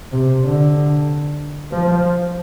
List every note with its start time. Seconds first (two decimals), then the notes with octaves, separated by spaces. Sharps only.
0.12 C3
0.44 D3
1.71 F3